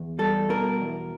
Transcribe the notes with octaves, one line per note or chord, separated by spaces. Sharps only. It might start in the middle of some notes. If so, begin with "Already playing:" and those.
Already playing: E2
G3 A4
B2 A#4
E2